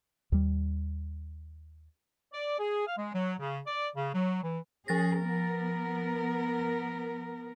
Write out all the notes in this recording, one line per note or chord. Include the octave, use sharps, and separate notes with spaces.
D#2 G3
D5
G#4
F5
G#3
F#3
C#3
D5
C#3
F#3
E3
F3 C#4 G#4 A6 A#6
B3 A#4